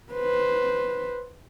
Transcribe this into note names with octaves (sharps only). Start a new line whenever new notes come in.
B4 C5